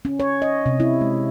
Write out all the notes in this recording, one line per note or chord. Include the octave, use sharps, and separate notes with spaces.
C#4
C#5
D#5
C3
E4
G#3